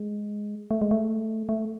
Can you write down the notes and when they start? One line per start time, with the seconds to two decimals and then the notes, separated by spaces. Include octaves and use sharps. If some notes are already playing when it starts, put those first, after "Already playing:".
Already playing: G#3
0.71 A3
0.81 G#3
0.91 A3
1.49 A3